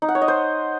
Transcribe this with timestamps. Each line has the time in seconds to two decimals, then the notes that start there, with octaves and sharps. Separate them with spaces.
0.02 D#4
0.08 F#5
0.15 C#5
0.22 D#5
0.28 C5